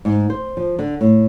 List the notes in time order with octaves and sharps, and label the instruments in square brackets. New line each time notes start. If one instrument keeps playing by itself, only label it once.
[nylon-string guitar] G#2
C5
F3
D3
A2